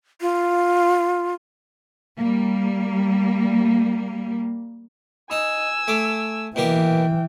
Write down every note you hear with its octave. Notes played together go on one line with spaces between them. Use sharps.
F4
G3 A#3
D#4 G#5 E6
A3 D6
B2 E3 A#3 G4 G5